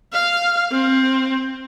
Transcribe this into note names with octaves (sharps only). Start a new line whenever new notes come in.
F5
C4